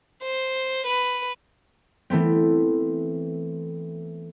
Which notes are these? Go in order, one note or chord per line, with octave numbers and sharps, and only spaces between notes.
C5
B4
E3 A3 B3 C4